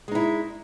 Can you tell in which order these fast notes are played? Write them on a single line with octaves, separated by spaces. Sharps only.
G#3 D#4 E4